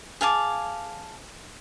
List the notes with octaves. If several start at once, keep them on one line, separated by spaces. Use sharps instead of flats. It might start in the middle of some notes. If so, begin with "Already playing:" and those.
G#4 F5 A5 D6